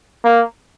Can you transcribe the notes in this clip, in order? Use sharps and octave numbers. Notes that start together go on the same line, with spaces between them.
A#3